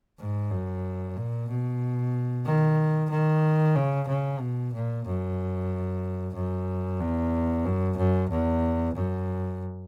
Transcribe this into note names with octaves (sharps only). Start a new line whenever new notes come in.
G#2
F#2
A#2
B2
D#3
D#3
C#3
C#3
B2
A#2
F#2
F#2
E2
F#2
F#2
E2
F#2